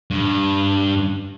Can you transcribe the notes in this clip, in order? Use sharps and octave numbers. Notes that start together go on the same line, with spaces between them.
G2